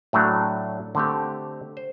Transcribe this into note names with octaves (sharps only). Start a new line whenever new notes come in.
A2 F#3 A3 D4 F#4
D3 A3 C4 G4
C5